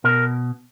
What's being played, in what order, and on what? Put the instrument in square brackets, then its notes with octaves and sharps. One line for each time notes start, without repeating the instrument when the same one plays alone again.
[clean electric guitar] B2 A#4